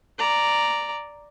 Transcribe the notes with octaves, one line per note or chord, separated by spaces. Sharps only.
D5 A#5